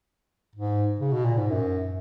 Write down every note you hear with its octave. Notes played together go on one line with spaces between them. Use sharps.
G#2
C#3
B2
A#2
G#2
F#2